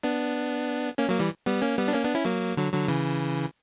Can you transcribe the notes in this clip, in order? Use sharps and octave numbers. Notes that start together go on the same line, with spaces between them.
B3 D4
A#3 C#4
F#3 A#3
E3 G3
G3 B3
A#3 C#4
G3 B3
D4
A#3 C#4
B3 D4
C#4 E4
F#3 A#3
D3 F#3
D3 F#3
C#3 E3